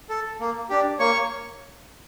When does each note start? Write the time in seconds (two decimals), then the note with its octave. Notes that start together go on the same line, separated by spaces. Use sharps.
0.09 A4
0.40 A#3
0.70 D4 G4
0.99 A#3 C#5 C#6